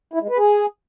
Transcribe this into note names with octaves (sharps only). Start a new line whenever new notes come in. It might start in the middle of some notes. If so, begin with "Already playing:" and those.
E4
G#3
B4
G#4